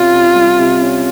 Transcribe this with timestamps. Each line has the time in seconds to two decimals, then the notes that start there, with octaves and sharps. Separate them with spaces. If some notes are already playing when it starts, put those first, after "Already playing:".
Already playing: C3 C#4 F4
0.12 C3
0.35 G3
0.58 C3
0.81 C#4